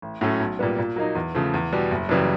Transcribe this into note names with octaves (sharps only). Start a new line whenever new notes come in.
A1
A2 F#3 A3 C#4
B1
A#2 G3 B3
A#2
F#3 A#3 D#4
E2
C#3 F3 A3
E2
B2 G3
F#1
F#2 C#3 E3 G3